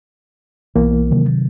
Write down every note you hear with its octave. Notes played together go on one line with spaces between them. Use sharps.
B1 E3 A#3 B3
C3 D#3 F#3